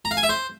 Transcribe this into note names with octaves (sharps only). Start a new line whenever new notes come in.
A#5
F5
G#5
E5
C5